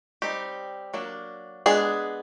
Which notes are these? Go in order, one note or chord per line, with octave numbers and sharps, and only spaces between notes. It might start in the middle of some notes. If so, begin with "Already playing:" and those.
G3 C4 D#4 G4
F#3 A#3 D4
G#3 B3 D4 G#4